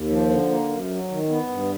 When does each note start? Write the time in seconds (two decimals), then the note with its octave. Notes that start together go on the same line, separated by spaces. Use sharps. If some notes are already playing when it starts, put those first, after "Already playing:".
Already playing: D#2
0.09 F3
0.29 D3
0.49 A#3
0.69 F#2
0.90 F#3
1.09 D#3
1.29 B3
1.49 G2